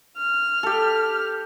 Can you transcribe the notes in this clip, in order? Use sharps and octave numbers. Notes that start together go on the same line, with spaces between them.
F6
G4 A4